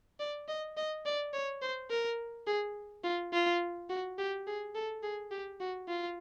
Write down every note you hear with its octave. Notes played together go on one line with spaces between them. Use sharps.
D5
D#5
D#5
D5
C#5
C5
A#4
G#4
F4
F4
F#4
G4
G#4
A4
G#4
G4
F#4
F4